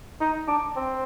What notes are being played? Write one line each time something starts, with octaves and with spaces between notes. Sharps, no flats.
D#4
D4
C4